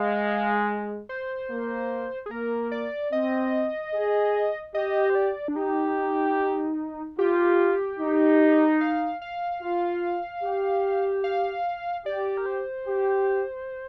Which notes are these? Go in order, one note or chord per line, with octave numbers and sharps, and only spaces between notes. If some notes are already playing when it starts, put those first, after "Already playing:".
Already playing: G#3 F5
C5
A#3
G#4
A#3 A#4
D5
C4 D#5
G#4
G4 D#5
C5
D5
D4
D#4 G4
F4 G4
D#4
F5
F5
F4
G4
F5
G4 D5
A#4
C5
G4